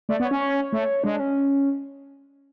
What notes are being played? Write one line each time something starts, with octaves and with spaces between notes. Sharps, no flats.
A3 D5
B3
C#5
C#4
C#5
A3
G#3 D4
D4
C#4